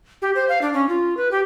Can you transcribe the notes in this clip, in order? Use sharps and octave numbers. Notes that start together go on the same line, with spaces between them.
G4
C5
F5
D4
C#4
F4
B4
G4